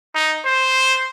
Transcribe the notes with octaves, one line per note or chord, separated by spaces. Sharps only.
D#4
C5